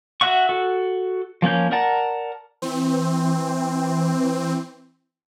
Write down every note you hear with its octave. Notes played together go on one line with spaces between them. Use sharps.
F#4 E5 F#5 C#6
F#4 A4
F3 A#3 C#4 G6
A#4 D5 F#5 A5 A#5
E3 C4